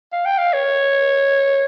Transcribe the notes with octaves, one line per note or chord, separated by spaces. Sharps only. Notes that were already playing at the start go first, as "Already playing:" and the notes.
F5
G5
F5
C#5